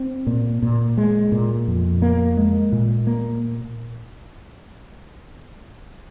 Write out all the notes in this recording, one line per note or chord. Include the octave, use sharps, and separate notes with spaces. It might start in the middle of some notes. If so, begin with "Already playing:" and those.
Already playing: C4
A#2
A#2
G#3
A#2
F2
A#3
G#3
A#2
A#3